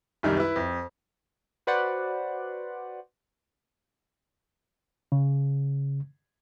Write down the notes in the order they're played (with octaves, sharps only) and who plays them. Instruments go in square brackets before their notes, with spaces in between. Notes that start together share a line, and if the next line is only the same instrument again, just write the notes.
[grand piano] C2 F#2 D#3 G3
E4 B4
F2
[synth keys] F#4 B4 C5 D5 F#5
[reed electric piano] C#3